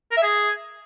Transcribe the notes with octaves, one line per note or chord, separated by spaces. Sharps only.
A#4
E5
G#4